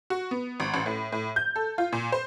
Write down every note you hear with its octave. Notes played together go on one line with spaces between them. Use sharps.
F#4
B3
G#1
A1
A2
A2
G6
A4
F4
A#2
C5